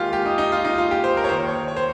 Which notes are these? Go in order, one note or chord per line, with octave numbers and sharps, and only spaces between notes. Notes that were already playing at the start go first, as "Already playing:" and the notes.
Already playing: D#2 D#3 G#3 F4 G4
G4
D#4
D#4
F4
D#4
F4
G4
C5
A#4
C#5
D#2 D#3 A#3 C5
C#5
C#5
C5